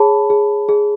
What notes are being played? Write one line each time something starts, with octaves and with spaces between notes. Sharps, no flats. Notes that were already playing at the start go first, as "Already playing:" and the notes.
Already playing: G#4 C#5 A5 B5
G#4
G#4